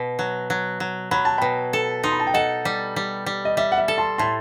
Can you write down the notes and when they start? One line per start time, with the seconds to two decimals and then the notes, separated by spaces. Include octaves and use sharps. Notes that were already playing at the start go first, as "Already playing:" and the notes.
Already playing: B2
0.19 F#3
0.50 F#3
0.80 F#3
1.11 F#3 B5
1.25 A5
1.38 B2 G5 B5
1.73 A4
2.04 D#4 C6
2.12 B5
2.20 A5
2.27 G5
2.34 A4 D#5 F#5
2.65 G3
2.96 G3
3.26 G3
3.45 D#5
3.57 G3 E5
3.72 F#5
3.78 E5
3.88 A4
3.98 A5 C6
4.18 A2 A5 C6